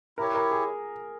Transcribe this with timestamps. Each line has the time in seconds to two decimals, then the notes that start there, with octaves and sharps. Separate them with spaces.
0.18 E4 G4 A#4 C#5
0.34 A#4
0.51 G#4